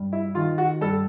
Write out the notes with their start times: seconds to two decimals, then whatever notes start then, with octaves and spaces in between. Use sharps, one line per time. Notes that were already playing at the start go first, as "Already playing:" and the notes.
Already playing: G2
0.13 E4
0.35 D#3 F4
0.58 F#4
0.81 G2 A4